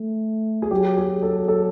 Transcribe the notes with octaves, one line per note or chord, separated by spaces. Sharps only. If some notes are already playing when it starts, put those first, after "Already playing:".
Already playing: A3
G#4
F#3 G4
G#4
A4
A4